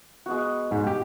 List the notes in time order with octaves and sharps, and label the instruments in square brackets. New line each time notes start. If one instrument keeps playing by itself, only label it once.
[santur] G#3 B3 F#4
[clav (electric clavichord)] G#2
G4